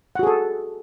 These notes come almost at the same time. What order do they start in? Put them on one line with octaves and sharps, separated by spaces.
F#5 F#4 G#4 A4